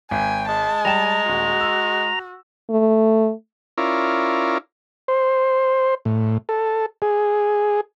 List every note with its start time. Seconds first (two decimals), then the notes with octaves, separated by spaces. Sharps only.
0.11 G#1 G5 G#5
0.48 G#3 A5
0.85 G3 G5 A#5 E7
1.28 D#1 F#4
1.60 E6
2.70 A3
3.78 C#4 E4 F4 A#4 D5
5.08 C5
6.05 A2
6.49 A4
7.02 G#4